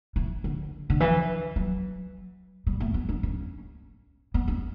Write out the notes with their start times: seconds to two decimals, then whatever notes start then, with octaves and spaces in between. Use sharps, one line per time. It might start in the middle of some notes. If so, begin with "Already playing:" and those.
0.16 E3
0.44 D3
0.90 D3
1.00 E3
1.56 F#3
2.67 G3
2.80 A3
2.94 B3
3.09 D4
3.23 C#4
4.34 B3
4.48 C#4